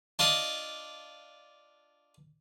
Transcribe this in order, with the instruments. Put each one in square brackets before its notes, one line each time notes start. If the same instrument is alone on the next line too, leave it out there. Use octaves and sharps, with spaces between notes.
[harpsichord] D4 F4 D#5